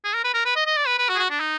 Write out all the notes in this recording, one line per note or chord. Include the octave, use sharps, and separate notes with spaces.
G#4
A#4
B4
A#4
B4
D#5
D#5
D5
B4
B4
F#4
G#4
F#4
D4
D#4